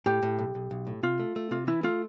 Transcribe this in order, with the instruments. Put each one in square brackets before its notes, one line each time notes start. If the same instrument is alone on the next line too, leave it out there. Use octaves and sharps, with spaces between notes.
[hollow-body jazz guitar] A2 [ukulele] G4
[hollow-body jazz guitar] A2
B1
B1
B1
A2
[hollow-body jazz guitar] C3 [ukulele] F4
[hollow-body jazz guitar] A3
A3
[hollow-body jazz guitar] C3 [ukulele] F4
[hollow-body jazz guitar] E3 [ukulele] E4
[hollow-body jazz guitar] A3 [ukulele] F4